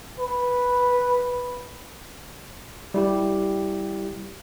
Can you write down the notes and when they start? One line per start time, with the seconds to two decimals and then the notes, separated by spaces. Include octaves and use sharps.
0.19 B4
2.94 G3 E4 G4